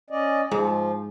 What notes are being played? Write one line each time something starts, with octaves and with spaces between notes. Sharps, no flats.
C#4 D5 D#5
G#2 F3